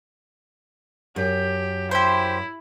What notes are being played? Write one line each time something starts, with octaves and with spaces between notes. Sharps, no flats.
F#2 G4
E4 G4 C5